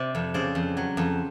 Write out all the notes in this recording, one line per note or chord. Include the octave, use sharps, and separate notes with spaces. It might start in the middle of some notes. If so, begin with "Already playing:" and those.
Already playing: C3 D5
F2
C#3 C5 D5
F2
F#3
F2